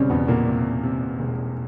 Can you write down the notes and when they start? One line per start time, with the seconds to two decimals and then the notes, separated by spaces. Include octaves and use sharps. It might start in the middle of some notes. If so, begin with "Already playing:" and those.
Already playing: E1 C#3 G3 C4 C#4
0.10 E2 B2 B3
0.28 A#2 A#3
0.47 C3
0.83 C3
1.19 E1